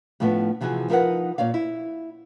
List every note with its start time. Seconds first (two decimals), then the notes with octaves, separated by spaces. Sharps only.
0.20 A2 F3 G3 A3 B3 D4
0.61 C3 E3 F3 F#4 G#4
0.90 F3 D#4 A#4 B4 D#5 F#5
1.38 A#2 C#5 D5 F5
1.54 E4